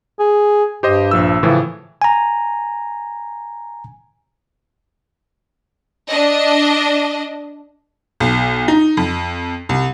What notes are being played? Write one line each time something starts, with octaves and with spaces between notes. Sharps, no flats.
G#4
G2 G4 C5 D#5
A#1 F3 E6
A2 C#3 E3 F3
G#5 A#5
D4 D#5
B1
D#4
F2
C2